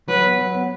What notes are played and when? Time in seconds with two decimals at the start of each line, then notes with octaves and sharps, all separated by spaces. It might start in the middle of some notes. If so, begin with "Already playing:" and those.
0.08 F#3 B4
0.24 B3
0.39 F#3
0.54 B3